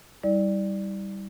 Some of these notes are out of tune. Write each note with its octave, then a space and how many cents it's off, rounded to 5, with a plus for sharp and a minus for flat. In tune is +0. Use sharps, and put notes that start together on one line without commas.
G3 +0 E4 -40 D5 +0